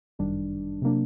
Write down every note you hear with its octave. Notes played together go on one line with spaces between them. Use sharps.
G1 F#2 D#3 G3 D4
C3 F#3 A#3 D4